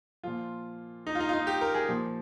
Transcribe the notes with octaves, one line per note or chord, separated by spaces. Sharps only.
A#2 F3 F4
D#4
F4
D#4
F4
D#4
G4
A#4
G#4
A#2 F3